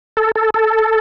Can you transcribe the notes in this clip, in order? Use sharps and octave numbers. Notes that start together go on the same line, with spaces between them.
A4
A4
A4